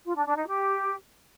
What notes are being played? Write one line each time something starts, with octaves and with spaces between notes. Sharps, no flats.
F4
D4
D4
D#4
G4